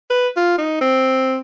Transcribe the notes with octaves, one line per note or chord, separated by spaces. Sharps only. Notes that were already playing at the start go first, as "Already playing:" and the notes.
B4
F4
D#4
C4